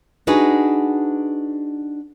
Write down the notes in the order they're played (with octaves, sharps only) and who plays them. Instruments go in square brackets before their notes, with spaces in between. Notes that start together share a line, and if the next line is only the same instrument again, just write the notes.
[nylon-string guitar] D4 D#4 F#4 G#4 B4